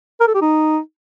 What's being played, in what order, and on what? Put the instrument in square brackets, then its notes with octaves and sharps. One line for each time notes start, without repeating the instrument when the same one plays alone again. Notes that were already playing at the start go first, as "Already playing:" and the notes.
[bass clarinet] A#4
A4
G4
D#4